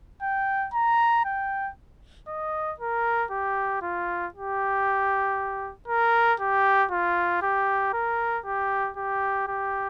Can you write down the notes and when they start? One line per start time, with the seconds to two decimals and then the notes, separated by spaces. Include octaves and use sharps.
0.22 G5
0.74 A#5
1.25 G5
2.28 D#5
2.80 A#4
3.31 G4
3.82 F4
4.34 G4
5.88 A#4
6.40 G4
6.92 F4
7.42 G4
7.94 A#4
8.46 G4
8.97 G4
9.48 G4